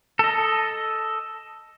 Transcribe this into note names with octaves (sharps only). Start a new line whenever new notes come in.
A4 D#5